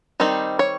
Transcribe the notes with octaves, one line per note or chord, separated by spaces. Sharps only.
D#3 G3 C4 D#4
C#5